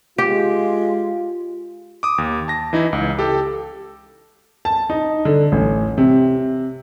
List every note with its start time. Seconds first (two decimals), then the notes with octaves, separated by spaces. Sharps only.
0.18 G#3 F4 G4
2.03 D6 D#6
2.18 D#2
2.48 A5 A#6
2.73 E3 D#4 E4
2.93 C#2
3.19 G4 A4
4.65 A5
4.90 D#4
5.25 D3
5.52 A1
5.98 C3